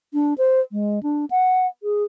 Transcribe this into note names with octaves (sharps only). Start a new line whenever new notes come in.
D4
C5
G#3
D4
F#5
G#4